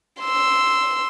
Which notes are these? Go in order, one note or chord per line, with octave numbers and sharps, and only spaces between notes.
C6 E6